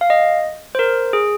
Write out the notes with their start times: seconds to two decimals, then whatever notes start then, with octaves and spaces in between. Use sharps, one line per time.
0.01 F5
0.10 D#5
0.75 C5
0.79 A#4
1.13 G#4